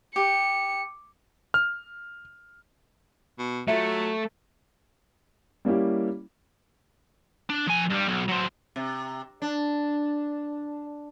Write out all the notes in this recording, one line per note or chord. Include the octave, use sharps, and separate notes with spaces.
G4 C#7
F6
B2
F#3 A3 F4 E5
G3 A#3 C#4 E4 G4
D4
F3 G#5
G2 G3
B1
F#3 C4
C3
D4